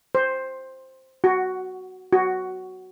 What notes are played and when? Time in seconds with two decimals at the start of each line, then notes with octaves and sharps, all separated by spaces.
0.15 C5
1.24 F#4
2.13 F#4